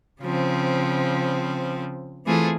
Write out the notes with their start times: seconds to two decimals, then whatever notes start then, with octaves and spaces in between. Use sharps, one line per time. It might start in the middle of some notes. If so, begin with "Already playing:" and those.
0.23 C#3 F3 C4
2.26 E3 A3 C4 F4 G#4 A4